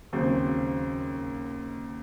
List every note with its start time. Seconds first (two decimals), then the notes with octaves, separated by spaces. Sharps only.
0.13 D#2 C#3 F#3 C4 C5